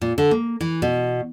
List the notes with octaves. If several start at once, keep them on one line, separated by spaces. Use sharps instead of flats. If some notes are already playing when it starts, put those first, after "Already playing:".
A#2
D3
A#3
E3
B2